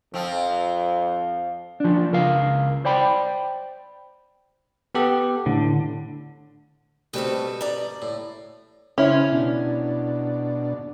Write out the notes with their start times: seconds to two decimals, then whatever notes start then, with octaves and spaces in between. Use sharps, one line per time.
0.14 F2 F3 C4
1.80 F3 D4
2.12 C#2 A#4 F5
2.85 C5 D5 G5 B5
4.95 B3 G4 A4
5.46 A2 D3
7.14 B2 G3 A3 C4 A4 B4
7.61 D5 A#5
8.02 A2
8.98 C#3 C#4 E4 C5 F6
9.32 B2 D4